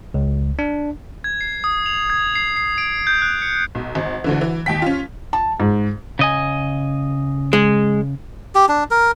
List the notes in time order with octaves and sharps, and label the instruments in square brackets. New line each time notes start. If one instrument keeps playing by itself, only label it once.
[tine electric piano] C#2
D4
[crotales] G#6
C7
D#6
F7
G#6
C7
C7
D7
G6
F#6
C#7
[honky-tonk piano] B1
G#1
D2 D3 E3
E3
D#2 G5 B6
C#4 F4
[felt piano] A5
G#2
[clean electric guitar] C#3 D#5 G#5
[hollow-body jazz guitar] G#3
[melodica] G4
D4
A#4